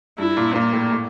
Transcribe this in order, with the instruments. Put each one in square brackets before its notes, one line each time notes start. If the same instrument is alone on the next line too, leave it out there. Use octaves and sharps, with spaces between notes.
[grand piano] G2 [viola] E4
[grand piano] A#2
[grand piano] A#2 [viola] A#3
[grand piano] A2
A2